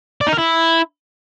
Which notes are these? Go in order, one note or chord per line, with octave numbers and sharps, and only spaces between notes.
D5
D#4
A#4
E4